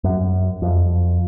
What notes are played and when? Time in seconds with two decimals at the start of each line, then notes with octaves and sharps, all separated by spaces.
0.04 F#2
0.62 F2